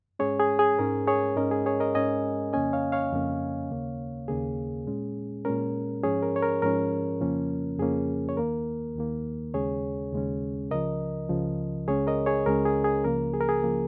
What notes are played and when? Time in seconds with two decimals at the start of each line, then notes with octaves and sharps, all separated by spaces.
0.19 G#2 G#3 C#4 G#4 C#5
0.40 G#4
0.59 G#4
0.79 G#2 G#3 C#4 A#4
1.07 G#4 C#5
1.37 G#2 G#3 C#4 A#4 D#5
1.51 G#4
1.66 G#4 C#5
1.80 A#4 D#5
1.95 G#2 G#3 C#4 D#5 G#5
2.53 F2 C#3 A#3 C#4 D#5 G#5
2.73 C#5 F5
2.92 C#5 F5
3.12 F2 C#3 A#3 C#4
3.70 D#2 C#3 A#3
4.28 D#2 C#3 A#3 G#4
4.87 A#2 G#3 C#4
5.45 A#2 G#3 C#4 A#4
6.03 G#2 F3 C#4 G#4 C#5
6.23 A#4
6.36 C#5
6.43 A#4
6.62 G#2 F3 C#4 A#4
7.21 F2 C#3 F3 A#3 C#4
7.79 F2 C#3 F3 A#3 C#4 G#4
8.29 C#5
8.37 D#2 D#3 A#3 A#4
8.95 D#2 D#3 A#3
9.54 D#2 C#3 G#3 C#4 G#4 C#5
10.13 D#2 C#3 G#3 C#4
10.71 C#2 C#3 F3 A#4 D#5
11.29 C#2 C#3 F3
11.87 C#2 C#3 G#3 C#4 G#4 C#5
12.07 A#4 D#5
12.26 G#4 C#5
12.46 C#2 C#3 G#3 C#4 A#4
12.65 G#4
12.84 G#4
13.04 C#2 C#3 F3 A#3 A#4
13.33 G#4
13.41 A#4
13.49 G#4
13.63 C#3 F3 A#3